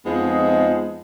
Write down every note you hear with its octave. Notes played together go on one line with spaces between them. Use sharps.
F2 F3 G#3 B3 D#4